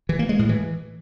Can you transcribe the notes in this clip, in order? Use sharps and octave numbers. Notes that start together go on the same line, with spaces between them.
E3
A#3
G#3
A2
E3